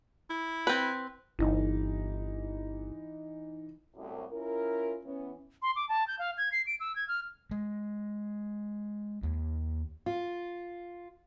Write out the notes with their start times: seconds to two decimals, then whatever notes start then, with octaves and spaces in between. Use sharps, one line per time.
0.30 E4
0.67 C4 B4
1.39 G1 E3 D#4
3.95 C2 F#2 A2
4.30 C#4 E4 F4 A#4
5.04 E3 B3 C#4
5.62 C6
5.76 D6
5.89 A5
6.08 G6
6.19 F5
6.38 G#6
6.52 C7
6.67 D7
6.80 E6
6.96 G#6
7.08 F6
7.51 G#3
9.23 D#2
10.06 F4